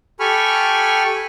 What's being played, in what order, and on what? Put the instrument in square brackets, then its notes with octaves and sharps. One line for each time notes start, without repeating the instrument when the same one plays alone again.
[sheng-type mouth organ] G4 A4 G#5 B5 C#6 F6